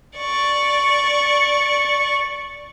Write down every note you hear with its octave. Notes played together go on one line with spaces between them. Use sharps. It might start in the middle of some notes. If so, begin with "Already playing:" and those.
D5 C#6